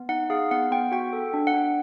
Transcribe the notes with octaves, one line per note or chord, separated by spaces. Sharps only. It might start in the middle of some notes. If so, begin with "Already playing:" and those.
Already playing: B3
D#4 F#5
G#4 F5
B3 F#5
B3 G5
F#4 G5
A4
D4
F#5
D4